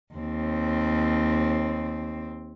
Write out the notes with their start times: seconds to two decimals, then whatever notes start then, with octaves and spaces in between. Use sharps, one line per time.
0.14 D#2 C4